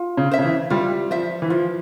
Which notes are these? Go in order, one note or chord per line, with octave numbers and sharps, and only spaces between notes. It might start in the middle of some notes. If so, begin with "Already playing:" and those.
Already playing: F4
C#3
C5 E5
C#3
E3
G3 F4
F3 C5 E5
E3
F3 F4